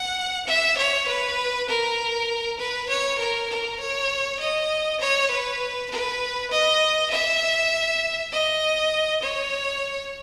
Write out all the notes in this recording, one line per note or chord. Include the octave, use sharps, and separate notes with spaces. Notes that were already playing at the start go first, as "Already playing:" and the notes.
Already playing: F#5
E5
C#5
B4
A#4
B4
C#5
A#4
A#4
C#5
D#5
C#5
B4
B4
D#5
E5
D#5
C#5